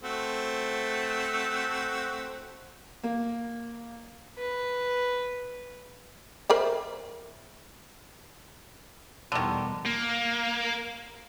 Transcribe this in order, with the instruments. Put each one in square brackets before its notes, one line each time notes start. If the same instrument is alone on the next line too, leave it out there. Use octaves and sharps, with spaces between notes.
[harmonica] A3 C4 F#4
[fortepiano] A#3
[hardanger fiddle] B4
[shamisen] A#4 C5 E5
[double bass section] E2 B2 G3 [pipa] D3 D#3
[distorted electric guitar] A#3